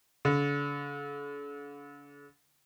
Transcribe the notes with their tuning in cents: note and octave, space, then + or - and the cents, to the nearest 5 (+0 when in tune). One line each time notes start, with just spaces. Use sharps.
D3 -45